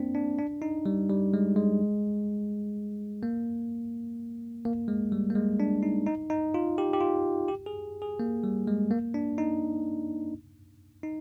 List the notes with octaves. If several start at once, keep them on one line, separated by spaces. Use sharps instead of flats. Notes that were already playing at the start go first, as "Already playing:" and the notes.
Already playing: A#3 C4 D4
D4
D4
D#4
G3
G3
G#3
G#3
A#3
A#3
G#3
G3
A#3
G#3
D4
D#4
D#4
D#4
F4
G4
G4
F4
G4
G#4
G#4
A#3
G3
G#3
A#3
D4
D#4
D#4